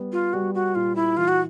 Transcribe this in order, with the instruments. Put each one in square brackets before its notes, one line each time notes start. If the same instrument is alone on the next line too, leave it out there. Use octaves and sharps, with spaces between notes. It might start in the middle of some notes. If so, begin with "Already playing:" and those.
Already playing: [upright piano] G3 B3
[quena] F4
[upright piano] G3 [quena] F#4
[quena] F#4
[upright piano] A#2 [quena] F4
[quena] E4
[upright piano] E3 [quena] F4
[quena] F#4